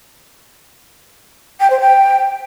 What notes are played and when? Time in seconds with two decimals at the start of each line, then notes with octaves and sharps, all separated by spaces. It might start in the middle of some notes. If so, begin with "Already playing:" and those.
1.60 G5
1.70 C5
1.80 G5